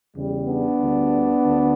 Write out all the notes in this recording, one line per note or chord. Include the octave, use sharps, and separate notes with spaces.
E2 C#3 G3
B3 D4
D2 D3 G3
D2 D3